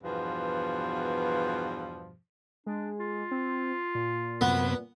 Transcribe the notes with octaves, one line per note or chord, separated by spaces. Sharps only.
E2 G2 B2 F3
G#3 D4
F4
C4
A#2
F#2 C3 B3 B4